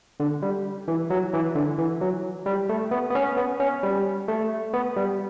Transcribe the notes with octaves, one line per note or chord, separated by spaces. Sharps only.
D3
G3
E3
F#3
E3
D3
E3
F#3
G3
A3
B3
B3
C#4
B3
C#4
G3
A3
B3
G3